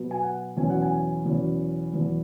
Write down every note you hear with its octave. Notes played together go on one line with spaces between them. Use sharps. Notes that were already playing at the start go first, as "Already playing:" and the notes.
Already playing: B2 F#3 B3
G#5
F#5
E2 B2 F#3 C#4 G#5
F#5
G#5
E2 B2 F#3 C#4
E2 B2 F#3